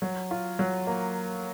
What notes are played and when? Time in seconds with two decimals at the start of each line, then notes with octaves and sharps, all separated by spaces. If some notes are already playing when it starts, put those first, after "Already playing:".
0.02 F#3
0.31 F4
0.59 F#3
0.87 A#3